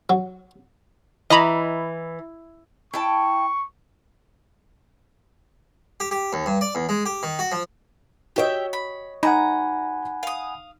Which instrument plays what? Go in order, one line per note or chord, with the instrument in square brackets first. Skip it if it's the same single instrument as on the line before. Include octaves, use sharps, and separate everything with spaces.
[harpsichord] F#3
[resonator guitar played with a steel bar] E3 [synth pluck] D#5 A#5 B5
[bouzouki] E4 G5 A5 [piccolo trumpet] C#6
[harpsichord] G4
G4
D#2
G2
D5
E2
G#3
G4
D#3
F#4
F3
[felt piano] F#4 C#5 D#5 [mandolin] G4 E5 G5
[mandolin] B5
[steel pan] D#4 [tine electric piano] F#5 G#5 B5 [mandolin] A#5
[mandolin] F5 D#6